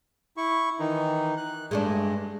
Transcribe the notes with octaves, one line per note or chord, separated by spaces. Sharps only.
E4 C#6
D#3 E3 D#4
F#6
G2 G#3 A3 D4